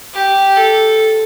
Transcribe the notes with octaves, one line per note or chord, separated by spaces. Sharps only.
G4
A4